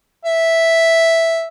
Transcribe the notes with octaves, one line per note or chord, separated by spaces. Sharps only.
E5